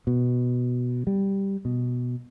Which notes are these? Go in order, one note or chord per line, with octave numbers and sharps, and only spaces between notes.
B2
G3
B2